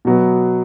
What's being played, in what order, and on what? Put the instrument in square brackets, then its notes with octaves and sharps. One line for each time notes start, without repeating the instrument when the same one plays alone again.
[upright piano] B2 F#3 B3